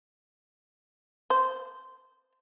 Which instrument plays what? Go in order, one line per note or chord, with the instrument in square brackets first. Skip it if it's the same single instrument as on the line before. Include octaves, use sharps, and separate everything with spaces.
[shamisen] C5